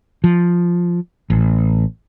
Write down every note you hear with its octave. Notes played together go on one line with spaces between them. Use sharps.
F3
A1